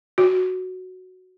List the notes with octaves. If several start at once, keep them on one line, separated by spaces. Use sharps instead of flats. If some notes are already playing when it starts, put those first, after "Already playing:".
F#4